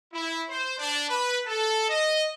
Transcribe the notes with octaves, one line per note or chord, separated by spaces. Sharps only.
E4
C5
D4
B4
A4
D#5